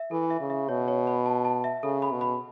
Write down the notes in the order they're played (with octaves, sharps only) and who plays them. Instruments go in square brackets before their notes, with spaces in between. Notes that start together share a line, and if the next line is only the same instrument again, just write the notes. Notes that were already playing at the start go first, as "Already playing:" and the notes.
Already playing: [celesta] E5
[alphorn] E3 [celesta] A4
[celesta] E5
[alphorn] C#3
[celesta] E5
[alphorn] B2 [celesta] C#5
[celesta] C#5
B5
A5
A5
E5
[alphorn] C#3 [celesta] A4
[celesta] B5
[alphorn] B2
[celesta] B5